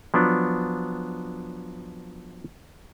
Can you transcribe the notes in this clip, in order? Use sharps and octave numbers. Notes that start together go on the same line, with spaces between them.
F3 F#3 B3 D4